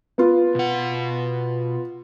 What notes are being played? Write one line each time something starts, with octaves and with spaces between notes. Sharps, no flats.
B3 F4
B2 F#5